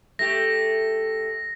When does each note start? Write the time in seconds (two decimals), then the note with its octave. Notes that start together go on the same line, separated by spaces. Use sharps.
0.19 A3 G4 A#6